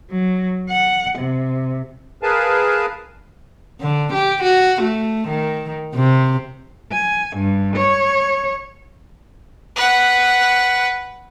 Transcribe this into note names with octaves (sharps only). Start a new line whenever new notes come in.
F#3
F#5
C3
G#4 A#4 B4 F5 G#5 A5
D3
G4
F#4
A3
D#3
C3
G#5
G2
C#5
B4 F#5